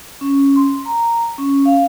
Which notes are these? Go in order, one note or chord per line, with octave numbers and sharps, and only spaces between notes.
C#4
C6
A#5
C#4
F5